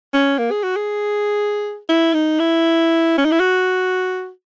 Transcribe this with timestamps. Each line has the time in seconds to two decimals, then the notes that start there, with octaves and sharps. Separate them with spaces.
0.14 C#4
0.39 A#3
0.51 G#4
0.63 F#4
0.76 G#4
1.89 E4
2.14 D#4
2.40 E4
3.18 C#4
3.25 D#4
3.32 E4
3.40 F#4